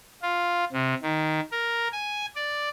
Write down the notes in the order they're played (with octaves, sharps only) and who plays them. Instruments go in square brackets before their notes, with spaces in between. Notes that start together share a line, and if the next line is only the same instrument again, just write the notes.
[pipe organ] F4
C3
D#3
A#4
G#5
D5